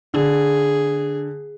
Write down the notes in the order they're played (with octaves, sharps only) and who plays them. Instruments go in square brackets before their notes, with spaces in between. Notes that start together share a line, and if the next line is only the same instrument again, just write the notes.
[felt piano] D3 [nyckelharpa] G#4